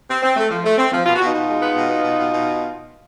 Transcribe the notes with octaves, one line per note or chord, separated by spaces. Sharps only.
C4
C4
A3
F3
A3
C4
F3
B2 F4
F#4
B2 D#4 F4
B2
G#3
B3
B2
B3
B2
B2
B2